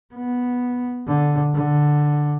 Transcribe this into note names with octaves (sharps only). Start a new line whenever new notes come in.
B3
D3
D3